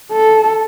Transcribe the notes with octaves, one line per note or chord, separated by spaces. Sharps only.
A4